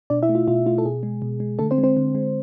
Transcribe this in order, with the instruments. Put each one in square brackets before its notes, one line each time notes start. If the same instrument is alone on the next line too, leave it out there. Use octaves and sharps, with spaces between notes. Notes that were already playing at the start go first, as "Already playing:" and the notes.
[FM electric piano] B2 D4 D5
E4 E5
A3
F4
B2 F4
A3 F4
A4
B2 G#4
G#3
B2
G#3
D3 A3 A4
C4 C5
G#3
C4 C5
D3
G#3